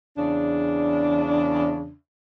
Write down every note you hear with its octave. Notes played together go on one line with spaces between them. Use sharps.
E2 C#3 D4